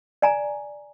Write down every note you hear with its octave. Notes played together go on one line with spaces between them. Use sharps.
D5 G#5 A#5